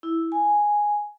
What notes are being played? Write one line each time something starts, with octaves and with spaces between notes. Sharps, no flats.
E4
G#5